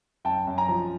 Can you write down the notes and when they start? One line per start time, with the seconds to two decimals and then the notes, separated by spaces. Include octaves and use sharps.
0.25 F#2 G5 A5
0.47 F#2
0.57 G#5 A#5
0.68 F3